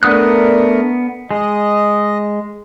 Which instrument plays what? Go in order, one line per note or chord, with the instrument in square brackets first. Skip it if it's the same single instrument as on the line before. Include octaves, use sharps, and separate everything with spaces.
[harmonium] A3 D4 A#4 [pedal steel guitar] B3 D#6 F#6
[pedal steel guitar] G#3 [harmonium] D#5